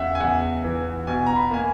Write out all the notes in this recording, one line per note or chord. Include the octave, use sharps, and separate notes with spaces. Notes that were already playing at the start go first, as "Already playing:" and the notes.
Already playing: E2 C#3 E5 F#5
G#5
E2 F#5
E3
B2 G#5
A#5
B5
A#3 G#5